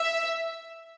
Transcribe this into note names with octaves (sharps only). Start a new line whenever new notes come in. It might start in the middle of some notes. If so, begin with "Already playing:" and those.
Already playing: E5